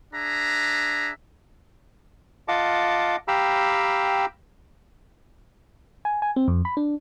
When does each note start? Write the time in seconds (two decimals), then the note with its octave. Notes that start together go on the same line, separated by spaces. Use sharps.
0.14 D4 G#4 E5 A#5
2.48 F4 D#5 F5 F#5 A5 D6
3.28 G4 F5 G5 A#5 B5 E6
6.05 G#5
6.22 G#5
6.36 C4
6.48 F2
6.65 B5
6.77 D4